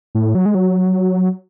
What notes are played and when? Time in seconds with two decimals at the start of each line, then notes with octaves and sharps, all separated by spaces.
0.15 A2
0.35 F#3
0.46 G#3
0.55 F#3